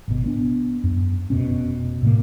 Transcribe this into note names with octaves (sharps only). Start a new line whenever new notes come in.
G#1 B2
B3 D4
F#2
F1 B2 C#4
A2 C3 A#3